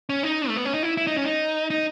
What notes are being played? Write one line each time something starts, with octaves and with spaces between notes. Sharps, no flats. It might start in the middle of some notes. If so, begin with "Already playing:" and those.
C#4
D#4
A3
B3
C#4
D#4
E4
E4
D#4
C#4
D#4
D#4